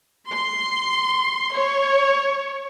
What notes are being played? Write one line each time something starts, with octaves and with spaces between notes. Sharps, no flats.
C6
C#5